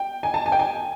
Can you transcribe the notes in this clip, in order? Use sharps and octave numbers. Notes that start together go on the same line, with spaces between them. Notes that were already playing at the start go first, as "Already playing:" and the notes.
Already playing: G5
G#5
A5
G#5
G5
G#5